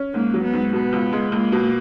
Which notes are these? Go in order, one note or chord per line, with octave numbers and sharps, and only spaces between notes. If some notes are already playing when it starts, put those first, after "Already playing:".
Already playing: C#4
G#2 A#3
F#3
B3
G#2
B2 B3
C#2
G#3
C#2 A#3
B2